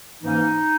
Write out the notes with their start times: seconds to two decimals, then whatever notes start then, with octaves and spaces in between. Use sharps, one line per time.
0.23 G#2 E3 A#3 C#4 D#4